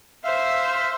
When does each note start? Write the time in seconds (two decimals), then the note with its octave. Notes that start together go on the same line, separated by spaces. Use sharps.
0.24 C5 E5 F5 C6